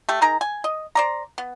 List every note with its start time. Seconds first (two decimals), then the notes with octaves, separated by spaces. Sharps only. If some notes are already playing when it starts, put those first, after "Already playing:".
0.09 A3 G4
0.22 D#4 G#4 A#4 A#5
0.41 G#5
0.64 D#5
0.95 C5 D5 A#5
1.38 B3